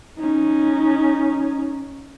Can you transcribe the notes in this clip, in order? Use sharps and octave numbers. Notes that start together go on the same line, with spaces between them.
C#4 D#4